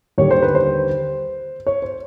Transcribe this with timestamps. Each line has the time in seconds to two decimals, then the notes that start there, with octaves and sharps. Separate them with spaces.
0.18 D#2 D3 G3 C#5
0.31 C5
0.42 B4
0.55 C5
1.67 C#5
1.82 C5